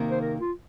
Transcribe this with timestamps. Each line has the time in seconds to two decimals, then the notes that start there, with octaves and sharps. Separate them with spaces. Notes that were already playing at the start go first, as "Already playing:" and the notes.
Already playing: C3 D#3 A#3
0.11 C5
0.21 A#4
0.39 F4